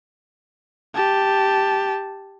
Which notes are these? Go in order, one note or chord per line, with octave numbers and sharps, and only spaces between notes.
G4 A5